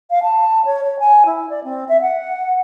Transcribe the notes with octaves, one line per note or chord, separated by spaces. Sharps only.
F5
A5
C#5
C#5
G#5
E4
D5
C4
E5
F#5